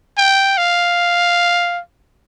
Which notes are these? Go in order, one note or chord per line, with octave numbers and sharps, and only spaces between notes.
G5
F5